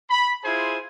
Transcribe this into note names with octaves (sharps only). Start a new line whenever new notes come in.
B5
E4 F4 G#4 C5 G#5